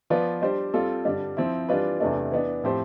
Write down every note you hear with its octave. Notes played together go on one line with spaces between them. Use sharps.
F3 B3 F4 B4 D5
G3 D4 G4 C5
G3 C4 F4 A4
G2 D3 G3 D4
F3 C4 E4
E3 G3 D4 F4 B4
E2 C3 E3 A3 D4
E3 B3 D4
A2 F3 C4 G4 C5